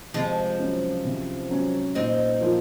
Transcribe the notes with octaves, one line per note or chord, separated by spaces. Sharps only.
C3 F3 G#3
F#3 C#4
C3
F#3 C#4
A#2 C4 D#4
F3 A#3 F4